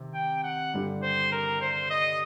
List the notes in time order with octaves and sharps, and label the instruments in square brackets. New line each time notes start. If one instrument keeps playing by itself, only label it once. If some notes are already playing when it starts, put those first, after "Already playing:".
Already playing: [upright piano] C3 D#3
[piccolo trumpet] G5
F#5
[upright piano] G2 D3 G3 D4
[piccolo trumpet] C5
A#4
C5
D#5